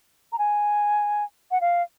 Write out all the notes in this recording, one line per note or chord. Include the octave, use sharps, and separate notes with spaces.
A#5
G#5
F#5
F5